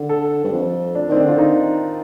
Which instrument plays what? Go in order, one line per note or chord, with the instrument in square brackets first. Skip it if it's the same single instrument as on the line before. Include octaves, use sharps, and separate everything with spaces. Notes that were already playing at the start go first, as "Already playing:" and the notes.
Already playing: [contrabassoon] D3
[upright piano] A4
[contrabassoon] G2
F2
[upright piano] D4
[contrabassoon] D#3 [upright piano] C4
[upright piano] D4
[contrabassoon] D3 [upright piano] F4
[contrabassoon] D#3 [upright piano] D#4